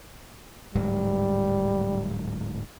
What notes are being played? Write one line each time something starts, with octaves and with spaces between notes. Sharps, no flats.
D1 G#2 F#3 G3